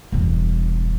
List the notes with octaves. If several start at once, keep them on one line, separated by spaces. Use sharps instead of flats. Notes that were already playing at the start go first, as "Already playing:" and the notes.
E1 G2